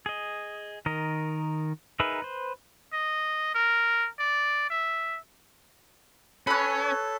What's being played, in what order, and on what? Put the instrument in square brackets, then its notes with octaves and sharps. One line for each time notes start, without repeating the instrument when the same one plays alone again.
[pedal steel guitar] G#4 D#5
D#3 A#4 D#5
D#4 G#4 A#4 B4 E5
B4 C5
[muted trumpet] D#5
A#4
D5
E5
[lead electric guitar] C#4 [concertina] A4 [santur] B4 C#5 [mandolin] B5 F#6